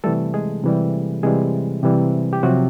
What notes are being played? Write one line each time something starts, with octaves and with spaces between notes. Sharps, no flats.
C3 E3 G3 A3 A4
G#3 G#4
C3 E3 G3
C3 E3 G3 G#3 G#4
C3 E3 G3
G4
C3 F3 F#3 F#4